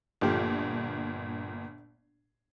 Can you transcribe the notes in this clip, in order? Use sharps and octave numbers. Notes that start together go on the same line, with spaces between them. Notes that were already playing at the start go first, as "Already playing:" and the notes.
G1 A#2 F3 A3 G4